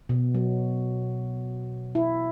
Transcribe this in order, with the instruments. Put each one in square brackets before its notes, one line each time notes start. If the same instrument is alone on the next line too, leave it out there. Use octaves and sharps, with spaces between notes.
[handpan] B2
F#3
E4